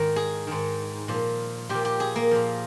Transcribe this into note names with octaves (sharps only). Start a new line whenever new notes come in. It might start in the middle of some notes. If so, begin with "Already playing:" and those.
Already playing: G#2 D#3 A#4
G#4
G#2 D#3
A#2 F3
A#2 F3 G4
G4
G#4
A#3
A#2 F3